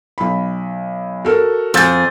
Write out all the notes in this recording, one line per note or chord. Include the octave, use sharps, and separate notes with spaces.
B1 B5
F#4 A4 A#4
F2 G#4 E6 G6 A6